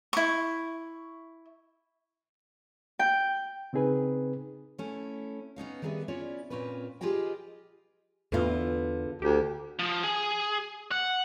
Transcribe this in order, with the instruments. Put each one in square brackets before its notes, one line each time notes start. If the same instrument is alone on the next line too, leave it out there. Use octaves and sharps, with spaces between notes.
[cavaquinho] E4 C#6
[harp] G5
[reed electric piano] C#3 C4 D#4 G#4 B4
[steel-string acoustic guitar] A3 C#4 E4
B3 C#4 D#4 F5
D#3 G3 B3 G#4 B4 E5
C#4 E4 F4 C#5 D5
A#2 C4 C#4 F4 B4
F4 G4 G#4 B4 D#5 G5
[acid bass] E2 [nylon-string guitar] D3 B3 F4
[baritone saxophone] D2 [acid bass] G4
[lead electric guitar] F3
G#4
F#5